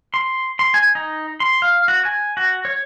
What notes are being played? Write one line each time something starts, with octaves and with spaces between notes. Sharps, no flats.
C6
C6
G#5
D#4
C6
F5
F#4
G#5
F#4
C#5